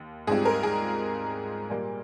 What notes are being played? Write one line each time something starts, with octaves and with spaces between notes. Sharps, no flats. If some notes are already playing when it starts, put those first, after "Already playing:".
Already playing: D#2
G#2 G3 C4 F4 G#4
A#4
G#4
A#2 G3 A#3